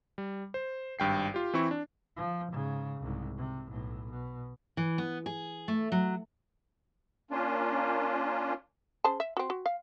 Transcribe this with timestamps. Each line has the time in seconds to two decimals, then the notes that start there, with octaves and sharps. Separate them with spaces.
0.18 G3
0.54 C5
0.99 G#1 G2 G5 C7
1.34 F4 G4
1.53 E3 C4 E4 C#6
1.71 D4
2.17 F3
2.52 G#2 C#3
3.00 C2 G#2
3.37 C3
3.69 B1 A2
4.11 B2
4.77 E3
4.98 B3
5.26 G#4
5.68 A3
5.92 F#3
7.31 A#3 C#4 D4 F4
9.04 C#3 C5 A5
9.20 E5
9.37 C4 F#4
9.50 F#4
9.66 F5